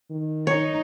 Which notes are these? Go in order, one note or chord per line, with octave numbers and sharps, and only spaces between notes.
D#3
D#4 C#5